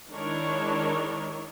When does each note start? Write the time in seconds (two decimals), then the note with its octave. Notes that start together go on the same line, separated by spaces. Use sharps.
0.11 D#3 G#3 D4 E4 A#4 C#5